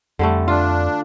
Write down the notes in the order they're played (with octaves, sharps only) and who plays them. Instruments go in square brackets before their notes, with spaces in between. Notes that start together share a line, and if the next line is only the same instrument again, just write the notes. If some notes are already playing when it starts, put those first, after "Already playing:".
[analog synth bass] F2 [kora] D3 G3 A3
[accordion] D4 [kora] F4